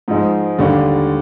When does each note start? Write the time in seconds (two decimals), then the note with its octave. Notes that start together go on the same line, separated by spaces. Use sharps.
0.08 G#2 F3 G#3 D#4
0.58 D#2 D3 G3 D4